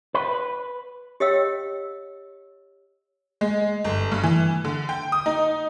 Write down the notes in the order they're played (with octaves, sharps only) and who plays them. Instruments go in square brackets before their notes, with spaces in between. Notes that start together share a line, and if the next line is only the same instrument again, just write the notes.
[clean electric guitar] B4
[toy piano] G4 C#5 D#5 F5 G5 E6
[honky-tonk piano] G#3
G1
G2
E3
D3
G5
D#6
D#4